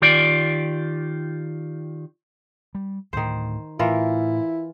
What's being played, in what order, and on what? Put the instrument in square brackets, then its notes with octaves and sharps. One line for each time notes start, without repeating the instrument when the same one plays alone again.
[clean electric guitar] D#3 F4 G4 D5
[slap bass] G3
[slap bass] D2 A2 [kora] D#3 C5
[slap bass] A2 [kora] E3 F4 A#4 [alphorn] E4